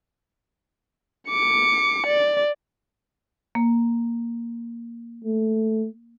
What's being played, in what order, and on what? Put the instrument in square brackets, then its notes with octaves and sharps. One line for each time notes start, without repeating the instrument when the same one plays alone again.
[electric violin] D6 C#7
D5
[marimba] A#3
[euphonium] A3